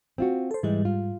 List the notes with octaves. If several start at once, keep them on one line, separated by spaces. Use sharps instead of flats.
C4 F4 F#4
A4 C5
G#2 E3 G3 G#3
F4